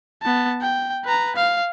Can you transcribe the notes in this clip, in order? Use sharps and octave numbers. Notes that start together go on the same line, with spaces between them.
B3 A5
G5
B4 A#5
F5